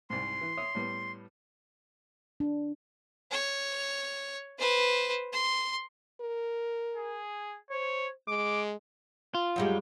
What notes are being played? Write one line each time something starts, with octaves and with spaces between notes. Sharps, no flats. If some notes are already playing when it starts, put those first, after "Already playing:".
C2 G#2 C6
E3
C#5 E5 D#6
A2 G3 B3
D4
C#5
B4 C5
C6
A#4
G#4
C5 C#5
G#3 D6
F4
F#2 G3 G#3